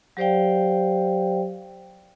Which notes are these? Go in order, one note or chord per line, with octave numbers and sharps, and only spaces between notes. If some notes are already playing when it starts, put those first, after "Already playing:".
F#3 G4 C5 D5 F5 G5